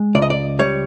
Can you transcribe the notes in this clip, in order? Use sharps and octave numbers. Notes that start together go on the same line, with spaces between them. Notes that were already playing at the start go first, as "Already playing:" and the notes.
Already playing: G#3
C#2 D5
D#5
D5
G3 C#5